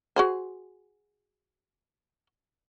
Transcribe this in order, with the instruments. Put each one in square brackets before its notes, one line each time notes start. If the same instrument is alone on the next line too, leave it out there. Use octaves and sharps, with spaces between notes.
[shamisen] F#4 G#4 C5